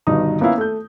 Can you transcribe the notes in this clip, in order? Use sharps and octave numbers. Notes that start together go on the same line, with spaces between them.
G1 G2 B2 D#3 D#4 D#6
A#3 B3 C#4 E4 F5
A3 G6